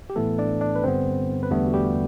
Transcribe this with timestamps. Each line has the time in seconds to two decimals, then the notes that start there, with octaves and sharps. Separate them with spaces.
0.10 G4
0.16 A2 E3 A3 B3 A4
0.38 D4 D5
0.61 D4 D5
0.76 B4
0.83 G2 D3 G3 B3 C4 C5
1.43 B4
1.51 E2 D3 G3 A3 B3 A4
1.66 F#4
1.74 G3 G4